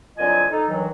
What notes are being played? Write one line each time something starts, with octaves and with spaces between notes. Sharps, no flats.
C2 D3 F#3 F4 D#5 G#5
D#4 A4
G2 D#3 E3 F#3